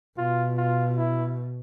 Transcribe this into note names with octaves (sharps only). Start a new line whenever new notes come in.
B2 F4
F4
E4